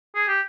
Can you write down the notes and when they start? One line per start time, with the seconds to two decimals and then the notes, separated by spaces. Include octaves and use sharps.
0.15 G#4
0.28 G4